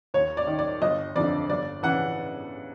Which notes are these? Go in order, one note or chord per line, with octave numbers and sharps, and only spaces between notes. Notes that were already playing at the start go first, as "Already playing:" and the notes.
D#2 C#5
D5
D#3
D5
G1 D#5
F2 D3 D5
G1 D5
C#3 E3 F#5